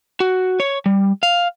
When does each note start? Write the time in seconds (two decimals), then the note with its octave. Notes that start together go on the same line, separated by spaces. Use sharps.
0.20 F#4
0.60 C#5
0.86 G3
1.23 F5